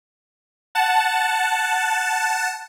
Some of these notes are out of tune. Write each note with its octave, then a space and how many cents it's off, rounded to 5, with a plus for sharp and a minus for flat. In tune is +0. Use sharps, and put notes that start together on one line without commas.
F#5 +0 A5 +0